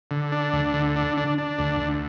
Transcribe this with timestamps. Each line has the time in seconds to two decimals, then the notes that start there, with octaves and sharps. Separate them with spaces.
0.11 D3
0.32 D4
0.53 D2
0.74 D3
0.96 D4
1.17 D4
1.38 D4
1.59 D2
1.80 D2